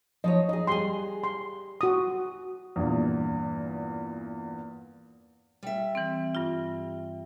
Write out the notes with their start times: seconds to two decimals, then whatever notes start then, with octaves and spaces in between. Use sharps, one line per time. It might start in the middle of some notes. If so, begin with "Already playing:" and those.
0.24 F3 D#4 C#5 D#5
0.49 D#4 G#4 D#5
0.67 G3 G#4 C6
1.24 C6
1.81 F#4 D#6
2.76 E2 G2 A#2
5.63 G3 E5
5.95 E3 C4
6.35 G2 F4